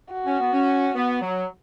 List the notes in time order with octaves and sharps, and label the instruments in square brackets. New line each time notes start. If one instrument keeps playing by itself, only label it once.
[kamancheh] F#4
[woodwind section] C#4
B3
C#4
B3
F#3